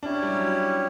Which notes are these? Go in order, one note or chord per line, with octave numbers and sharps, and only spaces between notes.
C#4 D4 E4 G4 C#5
G3
F#3